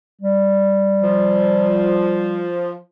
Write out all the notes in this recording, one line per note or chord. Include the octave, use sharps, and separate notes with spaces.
G3
F3